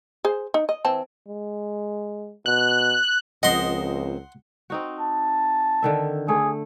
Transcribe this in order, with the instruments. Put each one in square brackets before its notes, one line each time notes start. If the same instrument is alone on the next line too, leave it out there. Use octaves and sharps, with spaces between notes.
[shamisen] G#4 C5
D#4
D#5
E3 C4 A5
[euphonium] G#3
[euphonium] B2 [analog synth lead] F#6
[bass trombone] C#2 [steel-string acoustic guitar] F3 C4 A#4 [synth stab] D#5 [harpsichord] F#5 C6
[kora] C4 D#4 F#4
[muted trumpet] A5
[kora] D3 D#3 E5
[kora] A3 [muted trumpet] G#4